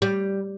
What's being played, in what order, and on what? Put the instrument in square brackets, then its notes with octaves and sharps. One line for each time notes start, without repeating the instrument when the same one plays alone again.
[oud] G3